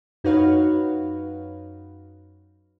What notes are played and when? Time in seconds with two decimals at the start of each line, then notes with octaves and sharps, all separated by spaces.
0.24 F#2 D#4 F#4 B4 C#5 F5